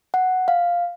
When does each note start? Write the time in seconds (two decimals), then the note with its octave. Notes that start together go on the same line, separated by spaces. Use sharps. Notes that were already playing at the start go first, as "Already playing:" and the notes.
0.14 F#5
0.48 F5